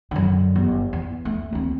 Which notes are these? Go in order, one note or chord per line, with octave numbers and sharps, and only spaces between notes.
F#2 D3
G1
E2
A3
D2 C4